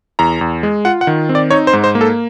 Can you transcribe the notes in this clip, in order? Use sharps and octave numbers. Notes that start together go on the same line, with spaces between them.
E2 A#5
E2
G#3
F4 F#5
F#5
D#3
C4
D5
D#4 C#5
C5
G#2
C5
A#3
A4